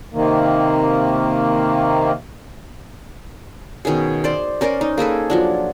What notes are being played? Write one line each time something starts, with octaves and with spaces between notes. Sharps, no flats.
C3 D#3 A#3
B2 D#3 C#4 G#4
C5 D5 C6
C#4 A#4 C5 D5
D#4
A#3 G#4 A4 B4
F3 F#3 D4